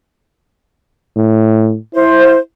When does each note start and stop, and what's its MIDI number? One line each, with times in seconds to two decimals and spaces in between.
1.16 1.78 45
1.95 2.39 64
1.95 2.37 72